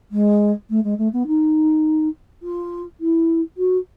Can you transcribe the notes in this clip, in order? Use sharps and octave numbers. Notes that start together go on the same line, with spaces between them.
G#3
A3
G#3
A3
B3
D#4
F4
E4
F#4